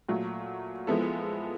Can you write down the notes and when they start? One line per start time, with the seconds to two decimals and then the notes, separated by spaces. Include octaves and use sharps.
0.09 A#2 F#3 A3
0.87 F3 G#3 B3 E4 A4